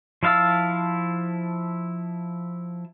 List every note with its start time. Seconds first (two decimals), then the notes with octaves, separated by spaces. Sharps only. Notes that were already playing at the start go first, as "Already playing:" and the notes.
0.23 F3 E4 F5 A5 E6